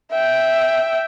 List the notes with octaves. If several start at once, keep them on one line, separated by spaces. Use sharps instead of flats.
E5 G5